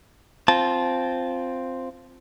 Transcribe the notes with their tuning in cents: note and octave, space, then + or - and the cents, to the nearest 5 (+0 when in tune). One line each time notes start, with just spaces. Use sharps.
C4 +0 F4 +0 A5 -20